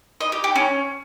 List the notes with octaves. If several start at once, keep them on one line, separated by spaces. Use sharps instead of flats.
D#5
G4
G4
C#4